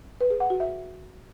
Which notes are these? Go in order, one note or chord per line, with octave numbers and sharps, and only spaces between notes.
B4
G#4
F#5
F#4
E5